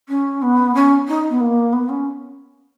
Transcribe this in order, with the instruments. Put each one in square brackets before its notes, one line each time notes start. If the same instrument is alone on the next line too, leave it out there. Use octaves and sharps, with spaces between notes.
[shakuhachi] C#4
B3
C#4
D#4
B3
A#3
B3
C#4